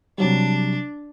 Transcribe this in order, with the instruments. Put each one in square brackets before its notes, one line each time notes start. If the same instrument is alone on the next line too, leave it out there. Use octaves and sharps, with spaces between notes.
[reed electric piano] C3 F#3 G3 [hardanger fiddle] D4